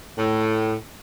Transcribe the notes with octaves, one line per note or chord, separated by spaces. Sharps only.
A2